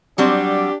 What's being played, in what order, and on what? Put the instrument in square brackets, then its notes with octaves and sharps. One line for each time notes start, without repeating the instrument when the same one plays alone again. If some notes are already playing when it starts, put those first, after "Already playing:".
[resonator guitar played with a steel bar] F#3 G3 C4 [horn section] D4 G4